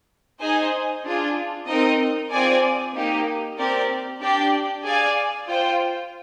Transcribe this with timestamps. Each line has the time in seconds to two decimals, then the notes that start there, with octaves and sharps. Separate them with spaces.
0.41 D#4 G#4 C5 D#5 G#5
1.05 D4 F4 G#4
1.68 C4 D#4 A#4 D#5
2.31 C4 F4 G#4 D5 G#5
2.95 A#3 D#4 G4
3.58 C4 G4 A#4 D5
4.21 D4 G4 D5 G5
4.84 G#4 D5 F5 G#5
5.48 F4 C5 G5